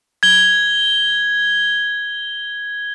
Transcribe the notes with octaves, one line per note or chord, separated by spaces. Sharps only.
G#6 G7